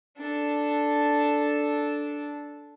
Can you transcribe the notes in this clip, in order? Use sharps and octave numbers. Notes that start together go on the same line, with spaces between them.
D4 A4